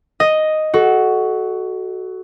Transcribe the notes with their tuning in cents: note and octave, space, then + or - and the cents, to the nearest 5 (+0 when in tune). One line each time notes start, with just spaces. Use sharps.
D#5 +0 D#6 +0
F#4 +10 A4 -20